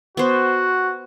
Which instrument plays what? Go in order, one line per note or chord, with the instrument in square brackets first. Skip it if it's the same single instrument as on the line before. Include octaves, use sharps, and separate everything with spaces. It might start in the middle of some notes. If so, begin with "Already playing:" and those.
[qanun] B3 C5 [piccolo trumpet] F#4